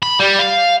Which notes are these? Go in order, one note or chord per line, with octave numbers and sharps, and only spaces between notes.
B5
G3
F5